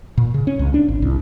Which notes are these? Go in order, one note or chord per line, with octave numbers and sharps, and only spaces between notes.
A#2
C#3
C#4
C#2
D4
G#1
C2